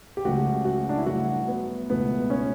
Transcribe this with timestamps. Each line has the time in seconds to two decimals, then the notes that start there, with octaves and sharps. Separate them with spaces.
0.17 G4
0.25 C#2 C#3 F#3 A3 F#4
0.65 F#4
0.89 D4
0.98 E4
1.06 G2 F#3 A3 F#4
1.48 B3
1.90 C#2 B2 A3 B3
2.30 C#4